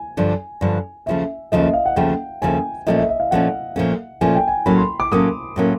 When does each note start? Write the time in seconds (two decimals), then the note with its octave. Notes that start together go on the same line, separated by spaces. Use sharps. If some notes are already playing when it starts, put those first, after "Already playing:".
Already playing: G#5
0.17 G2 D3 F3
0.61 G2 D3 F3
1.06 D#2 C#3 F3 A3 E5
1.52 D#2 C#3 F3 A3 D#5
1.63 E5
1.73 F5
1.86 F#5
1.96 D#2 C#3 F3 A3 G5
2.42 D#2 C#3 F3 A3 G#5
2.87 A#2 F3 A3 C#4 D#5
2.98 E5
3.09 E5
3.20 F5
3.31 A#2 F3 A3 C#4 F#5
3.76 A#2 F3 A3 C#4
4.21 A#2 F3 A3 C#4 G#5
4.35 G5
4.48 G#5
4.66 A2 F#3 A#3 C#4 B5
4.77 C6
5.00 D6
5.11 A2 F#3 A#3 C#4 D#6
5.56 A2 F#3 A#3 C#4